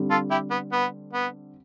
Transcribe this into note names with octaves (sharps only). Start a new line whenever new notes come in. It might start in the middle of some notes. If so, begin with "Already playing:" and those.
Already playing: D3 G3 C4
F4 A4
E4 G4
B3
B3
B3